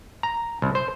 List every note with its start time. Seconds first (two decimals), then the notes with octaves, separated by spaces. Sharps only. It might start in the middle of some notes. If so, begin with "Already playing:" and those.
0.23 A#5
0.62 C2
0.75 C5